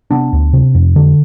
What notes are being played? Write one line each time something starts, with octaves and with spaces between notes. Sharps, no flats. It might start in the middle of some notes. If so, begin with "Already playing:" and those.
C3 B3 D4
D2
C3
F2
D3